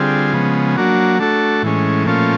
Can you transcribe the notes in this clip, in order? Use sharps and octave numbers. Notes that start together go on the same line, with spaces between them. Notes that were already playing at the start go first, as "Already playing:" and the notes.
Already playing: D3 G3 C4 F4 G#4
C#3 F3 G#3 B3
F#3 A#3 D4 F#4
A3 D4 F#4 A4
A2 E3 G#3 C#4
A#2 F3 A3 C#4 F4